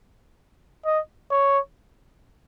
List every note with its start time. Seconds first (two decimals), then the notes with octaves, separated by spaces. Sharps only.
0.85 D#5
1.31 C#5